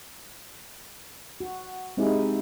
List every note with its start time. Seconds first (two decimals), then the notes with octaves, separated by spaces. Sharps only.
1.40 F#4
1.97 G#3 C4 D#4 E4 G4 G#4